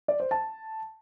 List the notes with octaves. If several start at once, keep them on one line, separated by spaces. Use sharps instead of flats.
D5
C5
A5